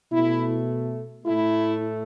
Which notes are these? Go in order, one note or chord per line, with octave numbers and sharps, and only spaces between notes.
B2 A3 E4
A2 A3 E4